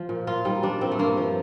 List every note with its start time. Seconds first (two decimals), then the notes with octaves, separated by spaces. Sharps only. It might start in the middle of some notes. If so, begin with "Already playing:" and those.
Already playing: F3
0.09 A#2
0.27 A#2 F4
0.45 G3 D#4
0.63 G3 D4
0.81 A#2 C4
0.91 A3
0.99 G2 A#3
1.17 F3